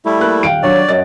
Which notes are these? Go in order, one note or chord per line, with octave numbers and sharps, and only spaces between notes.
G3 A3 E4
A#3 F#6
D#1 F5 G5 D7
F#3 D4 C#5 D5
F#2 F#4 D#5 A6